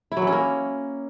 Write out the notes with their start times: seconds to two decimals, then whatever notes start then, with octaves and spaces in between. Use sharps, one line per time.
0.12 E4
0.17 F#3
0.22 E3
0.27 C#4
0.32 A#3